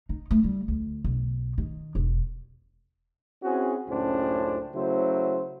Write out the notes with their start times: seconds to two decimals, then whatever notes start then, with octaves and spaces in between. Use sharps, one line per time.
0.09 D#4
0.31 A3
0.44 G3
0.68 D2
1.04 B1
1.58 D#3
1.95 E1
3.43 C4 C#4 E4 F#4 G#4
3.89 C#2 F#2 A2 C#4 D4 C5
4.75 C#3 F#3 A3 E4 C5